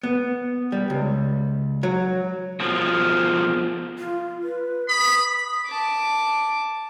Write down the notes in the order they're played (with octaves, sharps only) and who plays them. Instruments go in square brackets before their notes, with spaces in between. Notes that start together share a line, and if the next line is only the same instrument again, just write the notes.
[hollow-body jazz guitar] B3
G3
C#2
F#3
[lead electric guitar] B2 F3
[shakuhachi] F4
B4
[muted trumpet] B5 [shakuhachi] D#6
[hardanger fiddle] A5 D6